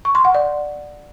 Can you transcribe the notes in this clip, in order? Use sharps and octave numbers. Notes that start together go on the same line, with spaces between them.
C#6
C6
F#5
D5